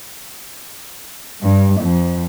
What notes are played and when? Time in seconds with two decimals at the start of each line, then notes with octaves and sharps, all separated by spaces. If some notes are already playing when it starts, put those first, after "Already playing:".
1.42 G2
1.80 F2